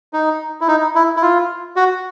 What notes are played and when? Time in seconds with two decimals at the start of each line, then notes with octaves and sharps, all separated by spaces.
0.13 D#4
0.61 E4
0.68 D#4
0.95 E4
1.16 E4
1.22 F4
1.76 F#4